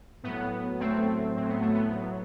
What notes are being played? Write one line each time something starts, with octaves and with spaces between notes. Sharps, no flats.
A2 F#3 B3
A2 F#3 A3 C4
A2 F#3 C4
B3
A3
B3
A2 F#3